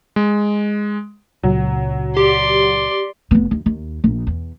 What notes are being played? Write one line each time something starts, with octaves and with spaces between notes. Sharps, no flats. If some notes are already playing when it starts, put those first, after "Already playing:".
G#3
C#2 A#2 C#3 F#3
G4 D5 C6
F1 B3
D#2
D#2
A#1
E2